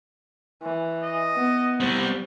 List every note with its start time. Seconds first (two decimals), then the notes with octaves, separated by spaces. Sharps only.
0.62 E3
1.03 D#5
1.36 B3
1.80 G3 C4